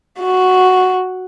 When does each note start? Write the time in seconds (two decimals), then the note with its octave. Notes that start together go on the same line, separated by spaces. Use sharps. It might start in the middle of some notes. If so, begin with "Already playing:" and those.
0.19 F#4